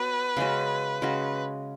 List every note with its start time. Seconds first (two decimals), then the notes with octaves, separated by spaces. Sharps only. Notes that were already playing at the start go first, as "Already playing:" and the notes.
Already playing: B3 F#4 B4 C#5
0.37 C#3 G#3 C#4 F#4
1.02 C#3 G#3 C#4 F#4